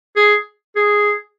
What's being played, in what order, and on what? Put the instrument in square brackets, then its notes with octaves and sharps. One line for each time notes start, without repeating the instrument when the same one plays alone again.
[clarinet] G#4
G#4